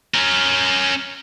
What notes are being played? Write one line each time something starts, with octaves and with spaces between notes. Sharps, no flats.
C#4 A#4